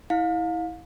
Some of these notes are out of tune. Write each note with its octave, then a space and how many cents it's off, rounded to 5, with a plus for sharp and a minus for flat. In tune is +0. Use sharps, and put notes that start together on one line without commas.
E4 -25 F5 +30